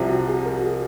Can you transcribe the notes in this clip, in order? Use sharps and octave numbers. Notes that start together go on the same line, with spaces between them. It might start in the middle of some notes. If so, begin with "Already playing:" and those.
Already playing: C2 C3 F3
F#4
G#4
A#4
F#4
G#4